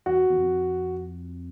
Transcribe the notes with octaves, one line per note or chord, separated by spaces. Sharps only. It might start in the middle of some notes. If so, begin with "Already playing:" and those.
E2 F#4
E2
F2